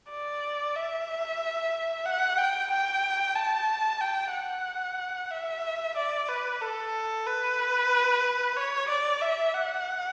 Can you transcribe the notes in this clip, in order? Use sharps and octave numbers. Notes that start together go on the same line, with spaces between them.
D5
E5
F#5
G5
G5
A5
G5
F#5
E5
D5
B4
A4
B4
C#5
D5
E5
F#5